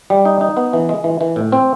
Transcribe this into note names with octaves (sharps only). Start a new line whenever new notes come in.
G3
D#4
D#4
B3
E3
G#3
E3
E3
A2
C4